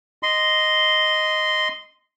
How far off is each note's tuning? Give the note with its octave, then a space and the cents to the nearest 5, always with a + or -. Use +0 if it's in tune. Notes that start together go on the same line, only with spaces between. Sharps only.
D#5 +0 C6 -10